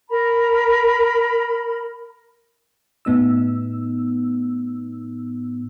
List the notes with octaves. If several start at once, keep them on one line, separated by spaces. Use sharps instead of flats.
A#4 A#5 B5
A2 B3 D#4 E6